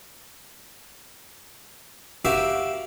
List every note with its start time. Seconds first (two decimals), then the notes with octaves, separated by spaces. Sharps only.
2.25 F#4 G4 A#4 E5 F5